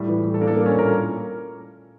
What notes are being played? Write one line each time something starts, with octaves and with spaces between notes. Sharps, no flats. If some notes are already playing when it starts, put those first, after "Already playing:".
Already playing: A2 G3
E3
A2
A4
A#3 D4 A#4
A4
A#3 A#4
G3
C#4 C#5
A#2 A#4 A#5